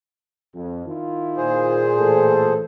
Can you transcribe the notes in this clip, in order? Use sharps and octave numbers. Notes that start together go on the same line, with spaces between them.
F2
D#3 E4 F4
A#2 G#4 C5
A2 E3 A4